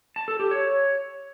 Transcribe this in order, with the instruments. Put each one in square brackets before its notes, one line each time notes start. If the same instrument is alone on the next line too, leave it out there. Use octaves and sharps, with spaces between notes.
[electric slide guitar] A5
A4
G4
C#5